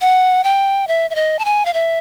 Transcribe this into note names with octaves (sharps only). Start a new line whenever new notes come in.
F#5
G5
E5
E5
D#5
A5
G#5
F5
E5